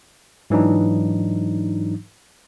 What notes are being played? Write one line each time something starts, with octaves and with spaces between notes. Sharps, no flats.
G#2 E3 F#3 D4 D#4